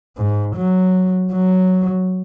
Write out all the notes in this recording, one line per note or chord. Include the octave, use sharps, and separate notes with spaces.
G#2
F#3
F#3